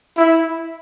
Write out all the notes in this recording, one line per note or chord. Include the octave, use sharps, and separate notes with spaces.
E4